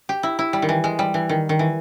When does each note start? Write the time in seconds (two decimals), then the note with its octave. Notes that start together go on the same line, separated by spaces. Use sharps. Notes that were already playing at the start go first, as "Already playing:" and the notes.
0.09 G4
0.23 E4
0.39 E4
0.53 G3
0.62 D#3
0.69 E3
0.84 G#3
0.99 G3
1.14 E3
1.29 D#3
1.49 D#3
1.59 E3